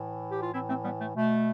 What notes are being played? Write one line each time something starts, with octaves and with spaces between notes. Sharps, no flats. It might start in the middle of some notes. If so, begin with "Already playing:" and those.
Already playing: A2 E3
G4
F4
A2 E3 C4 E4
A3 C4
G3 B3
A3
B2 A3